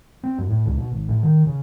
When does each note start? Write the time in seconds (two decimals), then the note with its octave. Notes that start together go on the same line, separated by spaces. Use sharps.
0.24 C4
0.38 F#2
0.50 A2
0.66 C#2
0.77 B2
0.91 G#1
1.09 A2
1.23 D#3
1.47 C#3